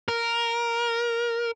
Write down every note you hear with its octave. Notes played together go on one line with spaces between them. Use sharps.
A#4